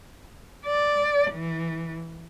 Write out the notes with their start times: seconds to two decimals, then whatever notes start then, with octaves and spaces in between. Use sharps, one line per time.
0.66 D5
1.32 E3